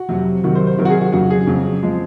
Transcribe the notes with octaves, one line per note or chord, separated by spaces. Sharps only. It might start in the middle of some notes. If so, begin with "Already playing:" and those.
Already playing: F#4
F2 C3 F#3
C3 D#3 F#3 F#4
C5
C5
C3 D#3 F#3 A#4
F#4
G#4
F#4
F2 C#3 F#3 F#4
G#4
F2 C#3 F#3
F3 G#3